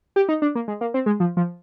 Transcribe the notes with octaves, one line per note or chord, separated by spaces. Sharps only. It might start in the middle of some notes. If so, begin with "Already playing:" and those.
G4
D#4
D4
A#3
G#3
A#3
C4
G#3
F3
F3